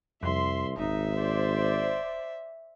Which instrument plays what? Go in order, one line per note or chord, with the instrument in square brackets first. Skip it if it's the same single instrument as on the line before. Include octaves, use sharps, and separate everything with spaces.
[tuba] C2 [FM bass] F2 [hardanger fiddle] E5 [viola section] C6
[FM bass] D#1 [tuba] G#1 [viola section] D#4 [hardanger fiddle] E5
[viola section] C5 D5